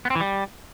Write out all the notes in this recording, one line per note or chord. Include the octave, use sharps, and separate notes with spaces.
B3
C4
E3
G3